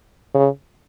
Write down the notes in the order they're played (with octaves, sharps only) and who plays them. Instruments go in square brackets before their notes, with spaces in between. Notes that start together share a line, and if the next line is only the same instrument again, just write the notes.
[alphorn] C#3